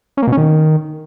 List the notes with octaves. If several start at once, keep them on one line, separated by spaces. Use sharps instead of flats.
C#4
A#3
B2
C#4
D#3